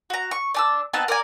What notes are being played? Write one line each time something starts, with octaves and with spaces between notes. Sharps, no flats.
F#4 A#5
C#6
D4 A5 E6
B3 C4 D#4 A5
A#4 D5 G#5